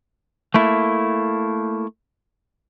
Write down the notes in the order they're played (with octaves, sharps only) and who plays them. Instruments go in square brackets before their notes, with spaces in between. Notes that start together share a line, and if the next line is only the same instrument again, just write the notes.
[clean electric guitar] A3 A#3 E4